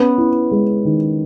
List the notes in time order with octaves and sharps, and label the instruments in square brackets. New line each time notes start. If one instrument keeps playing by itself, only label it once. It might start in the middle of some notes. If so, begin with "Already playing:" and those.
Already playing: [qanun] B3 [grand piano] C#4
[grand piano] E4
G#3
D#3